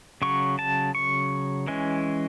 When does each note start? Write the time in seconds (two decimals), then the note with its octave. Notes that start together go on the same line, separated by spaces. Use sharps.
0.22 C#3 F#3 C#6
0.59 A5
0.95 C#6
1.67 E3 G#3 C#4